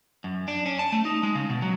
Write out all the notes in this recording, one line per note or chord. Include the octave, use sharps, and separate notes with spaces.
F#2
D4
C#4
A5
A3
D#4
G#3
C#3
B2
F#3